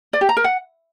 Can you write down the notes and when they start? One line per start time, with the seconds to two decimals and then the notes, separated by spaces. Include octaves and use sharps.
0.13 D5
0.21 G4
0.29 A#5
0.37 A#4
0.44 F#5